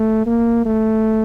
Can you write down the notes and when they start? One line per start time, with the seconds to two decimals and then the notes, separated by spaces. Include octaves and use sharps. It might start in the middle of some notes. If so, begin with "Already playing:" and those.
Already playing: A3
0.27 A#3
0.66 A3